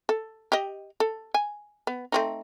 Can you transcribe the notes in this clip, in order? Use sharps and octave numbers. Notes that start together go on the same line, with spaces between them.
A4
G4 D#5
A4
G#5
B3
A3 C4 D#4